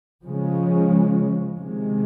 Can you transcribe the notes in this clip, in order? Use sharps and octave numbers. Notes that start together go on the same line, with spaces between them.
C#3 F3 G#3 C#4
C3 D#3 G#3